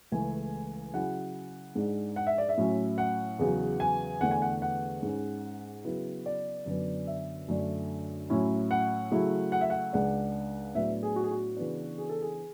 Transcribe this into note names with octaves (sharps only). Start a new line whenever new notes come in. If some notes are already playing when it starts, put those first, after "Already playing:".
C#2 C#3 E3 A3 E4 G#5
C#3 F#3 C#4 E4 F#5
G#2 G#3 D4
F#5
E5
D5
E5
A2 F#3 C#4
F#5
E2 C#3 F#3
G#5
E2 D3 A3 F#5
G#5
F#5
F#5
G#2 G#3 C#4
C#3 F#3 B3 E4
D5
F#2 D3 F#3 B3
E5
F#2 D3 A3 D4
A2 F#3 C#4 E4
F#5
C#3 F#3 A3 E4
F#5
E5
F#5
C#2 C#3 G#3 D4 F#5
A2 F#3 B3 D4 E5
G#4
F#4
G#4
F#4
C#3 E3 B3 D4
G#4
A4
G#4